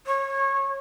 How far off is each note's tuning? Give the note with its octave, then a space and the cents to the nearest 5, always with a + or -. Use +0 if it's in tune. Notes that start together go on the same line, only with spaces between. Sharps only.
C#5 -25